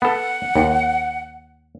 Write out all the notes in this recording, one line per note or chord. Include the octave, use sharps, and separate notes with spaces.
B3 A4 F#5
D#2